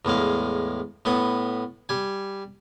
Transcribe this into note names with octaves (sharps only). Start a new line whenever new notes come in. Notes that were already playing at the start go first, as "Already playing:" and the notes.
E2 A2 G#3 F5
A2 B3 D#6
G3 G#5